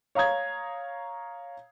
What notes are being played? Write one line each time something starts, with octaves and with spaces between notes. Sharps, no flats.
C#5 F5 A#5 D#6 G#6